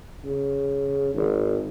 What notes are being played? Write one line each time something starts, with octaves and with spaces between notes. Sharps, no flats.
C#3
G#1